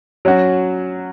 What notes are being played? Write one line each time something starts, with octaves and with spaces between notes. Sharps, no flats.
F#3 C#4 F#4